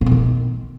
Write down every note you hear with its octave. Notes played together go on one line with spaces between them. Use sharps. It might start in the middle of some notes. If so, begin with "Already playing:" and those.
A#2
B2
D#3